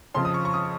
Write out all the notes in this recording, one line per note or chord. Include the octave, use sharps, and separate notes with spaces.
F2 C#3 F3 C6
D#6
C#6
C#6
D#6